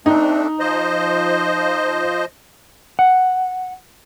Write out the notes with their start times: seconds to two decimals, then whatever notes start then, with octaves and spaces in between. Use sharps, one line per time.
0.06 A3 C4 D4 D#4
0.60 F3 C5 D#5
2.99 F#5